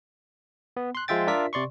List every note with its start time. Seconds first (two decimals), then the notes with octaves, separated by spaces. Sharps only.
0.77 B3
0.95 C6 F#6
1.08 F3 G#3 F4 E5 G5 A6
1.27 D4 F4 A#4 D5 E5 B6
1.53 C3 D5 C6 C#6